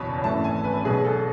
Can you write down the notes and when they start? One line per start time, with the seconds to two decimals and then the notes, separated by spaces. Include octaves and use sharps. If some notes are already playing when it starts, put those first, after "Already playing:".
Already playing: F#1 E2 B2 C#5 A5 B5
0.24 G#1 F#2 E3 A3 A5
0.44 G#5
0.64 B4
0.85 B1 B2 F#3 G#4
1.05 A4